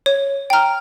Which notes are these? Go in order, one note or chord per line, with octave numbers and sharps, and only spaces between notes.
C#5
G5 A#5 F6